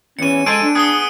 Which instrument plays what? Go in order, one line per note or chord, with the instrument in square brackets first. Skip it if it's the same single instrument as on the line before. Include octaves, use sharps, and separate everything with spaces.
[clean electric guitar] E2 E3 [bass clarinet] C#4 [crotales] C#7 D#7
[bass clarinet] G#3 [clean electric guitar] A4 C5 G#5 [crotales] D7 D#7
[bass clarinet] D4
[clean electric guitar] B3 G#4 [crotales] D#6 G7